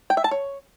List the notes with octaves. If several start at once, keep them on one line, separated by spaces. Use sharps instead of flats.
G5
E5
A5
C#5